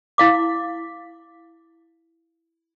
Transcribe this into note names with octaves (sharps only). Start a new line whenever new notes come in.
E4 F5 D6